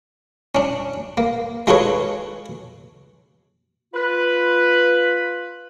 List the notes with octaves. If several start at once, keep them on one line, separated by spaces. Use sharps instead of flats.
C#4 D4
A#3
G#3 D#4 F4 A4 B4 C#5
F4 B4